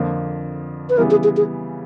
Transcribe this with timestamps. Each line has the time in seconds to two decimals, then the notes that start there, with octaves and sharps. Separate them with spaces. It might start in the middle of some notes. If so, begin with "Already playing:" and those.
Already playing: F2 D3 F3 A#3
0.89 B4
0.97 C#3 E3 G3 B3 E4 A#4
1.11 G#4
1.24 G#4
1.37 G#4